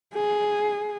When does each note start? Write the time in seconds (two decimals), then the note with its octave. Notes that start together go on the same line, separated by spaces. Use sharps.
0.14 G#4